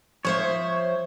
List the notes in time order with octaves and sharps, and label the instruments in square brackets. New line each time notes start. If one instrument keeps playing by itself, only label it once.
[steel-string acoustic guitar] F3 C5 E5 [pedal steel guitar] C#5